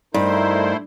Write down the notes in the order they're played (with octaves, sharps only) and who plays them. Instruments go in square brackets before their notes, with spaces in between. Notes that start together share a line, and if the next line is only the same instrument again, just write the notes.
[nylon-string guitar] G2 [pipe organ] A3 E4 C5 [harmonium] D#4 A#4